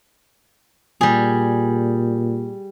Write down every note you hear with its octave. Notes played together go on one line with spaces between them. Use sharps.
A#2 G3 G#4